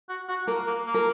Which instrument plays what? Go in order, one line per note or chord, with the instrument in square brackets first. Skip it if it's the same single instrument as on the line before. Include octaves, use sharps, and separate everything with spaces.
[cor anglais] F#4
F#4
[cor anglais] A#3 [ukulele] A#4
[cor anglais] A#3
A#3
[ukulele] A#4